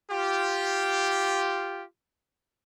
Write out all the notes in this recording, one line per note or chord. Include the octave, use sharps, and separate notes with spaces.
F4 G4